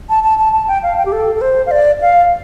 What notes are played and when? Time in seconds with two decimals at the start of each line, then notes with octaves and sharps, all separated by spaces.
0.09 A5
0.24 A5
0.39 A5
0.53 A5
0.68 G5
0.83 F5
0.98 G5
1.05 G4
1.12 A4
1.35 A4
1.41 C5
1.66 F5
1.71 D5
2.01 F5